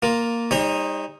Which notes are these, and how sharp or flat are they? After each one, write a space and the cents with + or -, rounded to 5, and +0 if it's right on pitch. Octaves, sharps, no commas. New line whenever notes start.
A#3 +0 F4 +10
G3 +40 D#4 +0 C#5 -45